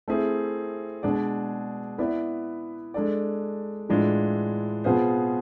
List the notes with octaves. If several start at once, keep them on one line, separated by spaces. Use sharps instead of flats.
A3 C4 E4 G#4
B2 G#3 D4 G#4 D5
B3 E4 B4 D5
G#3 D4 A4 D5
A2 E3 G#3 D4 F4
B2 B3 F4 G#4 C5